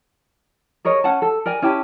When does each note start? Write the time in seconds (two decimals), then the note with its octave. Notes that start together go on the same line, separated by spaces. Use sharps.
0.85 G#4 A#4 C#5 D#5
1.04 C#4 F#5 A5
1.22 A4
1.46 A#4 D5 G#5
1.62 C#4 E4 G4 A5